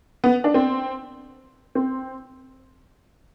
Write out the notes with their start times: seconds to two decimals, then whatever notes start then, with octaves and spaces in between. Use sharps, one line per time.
0.24 B3
0.44 D4
0.54 C4
1.75 C4